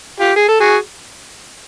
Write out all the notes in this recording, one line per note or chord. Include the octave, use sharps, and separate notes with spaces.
F4 G4
G#4
A4
F#4 G#4